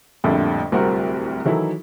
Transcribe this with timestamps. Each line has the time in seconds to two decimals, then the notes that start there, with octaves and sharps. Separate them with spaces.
0.24 A#1 F2 A2 D3 G3
0.72 D1 C2 C4 F#4 A#4
1.45 D#3 E3 F#3 D#4 E4 A4